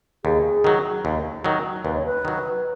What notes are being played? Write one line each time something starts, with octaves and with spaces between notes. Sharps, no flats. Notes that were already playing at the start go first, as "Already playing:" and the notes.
D#2 G#4
D#3 F#3
D#2
D#3 F#3
D#2 B4
C#5
B4
D#3 F#3